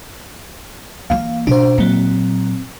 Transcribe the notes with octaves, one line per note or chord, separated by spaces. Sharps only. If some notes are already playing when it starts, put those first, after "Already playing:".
E3 A#3 F5
B2 D4 C5
A#2 F#3 C4